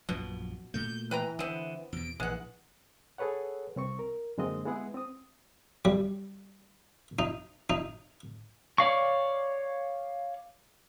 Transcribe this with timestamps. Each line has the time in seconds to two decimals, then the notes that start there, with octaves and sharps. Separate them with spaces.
0.09 A#1 F#2 B2 F3
0.74 A#2 A3 G6
1.11 E3 B4 G5 A#5
1.39 D3 B3 C4
1.93 E2 B2 D7
2.20 A#1 E3 G#3 F#5
3.18 G#4 A4 B4 C#5 F#5
3.76 C2 C4 C#6
3.99 A#4
4.38 F#2 D3 G#3 A#3 C4 D#5
4.65 G#3 B3 E4 G#4 F#5
4.94 C4 D#6
5.85 G3
7.19 D#4
7.70 D#4
8.78 C#5 D5 F5 C#6